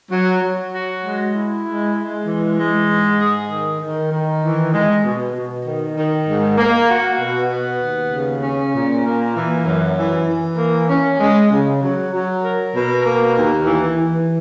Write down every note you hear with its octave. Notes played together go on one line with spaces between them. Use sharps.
F#3
F#3
F#4
G#3
E4
G#3
G#3
E3
G#3
G#2
G#4
D#3
D#3
D#3
E3
G#3
B2
B2
D#3
D#3
G#2
A#3
F#4
B2
B3
D#2
C#3
C#4
A#2
A#3
E3
F#2
E3
E3
A#3
C#4
G#3
C#3
F#3
F#3
A#4
B2
A#3
D#2
E3
E3